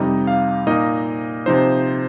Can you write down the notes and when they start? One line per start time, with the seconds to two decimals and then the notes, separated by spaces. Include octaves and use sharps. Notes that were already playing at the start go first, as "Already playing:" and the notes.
Already playing: F2 C3 G3 D#4 D#5
0.27 F5
0.67 A#2 A#3 D#4 D#5
1.46 C3 F3 D#4 C5